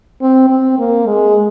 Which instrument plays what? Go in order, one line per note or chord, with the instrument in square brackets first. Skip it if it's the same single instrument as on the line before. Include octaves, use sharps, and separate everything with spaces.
[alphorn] C4
C4
A#3
G#3